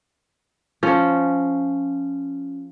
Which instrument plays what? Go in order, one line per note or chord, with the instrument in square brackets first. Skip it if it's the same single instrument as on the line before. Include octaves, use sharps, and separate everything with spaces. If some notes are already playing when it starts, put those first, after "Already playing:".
[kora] F3 C#4